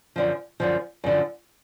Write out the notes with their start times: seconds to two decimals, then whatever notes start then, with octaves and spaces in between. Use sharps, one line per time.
0.16 F#2 D3 F3
0.60 F#2 D3 F3
1.04 F#2 D3 F3